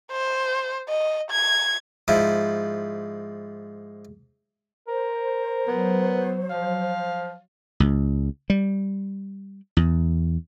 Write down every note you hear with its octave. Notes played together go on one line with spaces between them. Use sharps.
C5
D#5
G#6
G#2 F3 E4
A#4 C5
F#3 B3
F3 F5
C#2
G3
E2